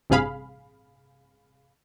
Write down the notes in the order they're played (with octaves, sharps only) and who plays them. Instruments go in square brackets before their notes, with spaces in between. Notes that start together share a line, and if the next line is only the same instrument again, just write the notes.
[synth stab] A1 G2 C3 G#4 F5 B5